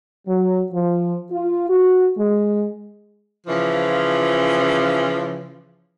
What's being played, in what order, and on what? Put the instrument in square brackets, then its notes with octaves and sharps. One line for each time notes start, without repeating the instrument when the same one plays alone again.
[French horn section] F#3
F3
F4
F#4
G#3
[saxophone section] C#3 E3 F3